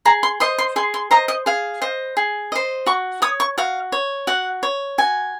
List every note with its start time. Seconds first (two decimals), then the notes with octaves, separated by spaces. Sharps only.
0.05 G#4 A#5
0.23 C6
0.40 C5 D#5 C6
0.58 C6
0.76 G#4 C6
0.94 C6
1.11 C5 D#5 A#5
1.28 D#5
1.46 G#4 F5
1.82 C5 D#5
2.17 G#4
2.52 C5 D#5
2.86 F#4 C#6
3.22 C#5 D#6
3.40 C#6
3.58 F#4 F5
3.92 C#5
4.27 F#4 F#5
4.63 C#5
4.98 F#4 G#5